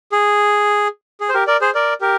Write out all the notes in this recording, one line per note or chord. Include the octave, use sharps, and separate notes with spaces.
G#4
G#4
C5
G4 A#4
A#4 D5
G#4 C5
A#4 D5
G4 A#4